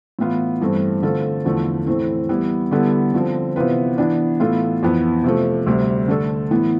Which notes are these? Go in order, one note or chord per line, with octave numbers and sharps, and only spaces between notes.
A2 E3 B3 F4
G2 E3 A3 C4
D3 A3 C4 F4 A4
E2 D3 F3 A3
A2 E3 A3 C4
E3 G3 B3 E4
D3 G3 B3 E4 A4
D3 F3 C4
C3 E3 B3 F4 B4
E3 B3 D4
A2 E3 B3 F4 A4
F2 E3 B3
C3 F3 A3
D2 C3 G3
D3 A3 D4 A4
A2 E3 B3